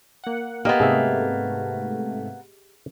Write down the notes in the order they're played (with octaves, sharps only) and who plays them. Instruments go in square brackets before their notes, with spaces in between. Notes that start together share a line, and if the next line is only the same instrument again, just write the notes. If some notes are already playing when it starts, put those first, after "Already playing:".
[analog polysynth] A#3 F#5
[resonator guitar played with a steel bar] A#3 B3 [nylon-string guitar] G4 D#5
[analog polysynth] G#2 C3 A3 [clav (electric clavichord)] G#4 E5